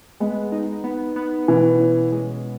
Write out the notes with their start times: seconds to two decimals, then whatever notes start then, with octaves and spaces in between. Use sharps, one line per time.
0.20 G#3 B3
0.52 D#4
0.84 B3
1.16 B3
1.48 B2 E3
1.80 C#4
2.12 G#3